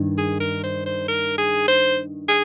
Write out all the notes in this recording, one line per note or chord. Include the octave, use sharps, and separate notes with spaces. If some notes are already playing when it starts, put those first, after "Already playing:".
Already playing: G2 D#3
G#4
A#4
C5
C5
A#4
G#4
C5
G#4